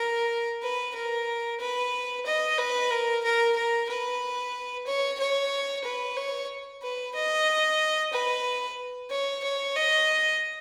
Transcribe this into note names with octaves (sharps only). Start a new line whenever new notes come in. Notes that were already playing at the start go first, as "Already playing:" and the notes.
Already playing: A#4
B4
A#4
B4
D#5
B4
A#4
A#4
A#4
B4
C#5
C#5
B4
C#5
B4
D#5
B4
C#5
C#5
D#5